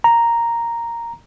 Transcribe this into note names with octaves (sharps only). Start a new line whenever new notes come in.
A#5